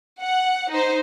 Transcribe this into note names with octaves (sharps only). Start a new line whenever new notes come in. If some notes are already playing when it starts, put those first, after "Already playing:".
F#5
D#4 C5